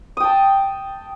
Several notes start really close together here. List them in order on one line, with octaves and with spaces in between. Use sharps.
D#6 G5 A5